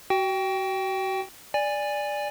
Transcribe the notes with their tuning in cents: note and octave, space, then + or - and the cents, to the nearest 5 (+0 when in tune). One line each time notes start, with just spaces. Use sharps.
F#4 +30 G5 +0
D5 +0 G#5 -15